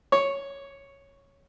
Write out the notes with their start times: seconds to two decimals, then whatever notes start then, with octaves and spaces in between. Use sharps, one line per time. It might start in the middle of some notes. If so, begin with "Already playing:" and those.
0.12 C#5